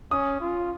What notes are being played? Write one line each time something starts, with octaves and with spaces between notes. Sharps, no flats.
C#4 D#6
F4